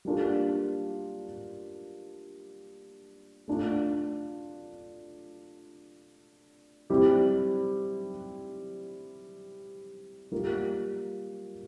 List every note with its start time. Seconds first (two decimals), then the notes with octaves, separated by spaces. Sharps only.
0.05 G3 A#3 D4 F4 A4
3.48 A3 D4 F4
6.90 G3 C4 E4 G4
10.31 G3 A#3 F4 A#4